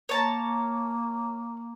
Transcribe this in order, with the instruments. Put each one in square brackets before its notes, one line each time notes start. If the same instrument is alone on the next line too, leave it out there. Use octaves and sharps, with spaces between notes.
[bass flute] A#3 [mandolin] C#5 A5 A#5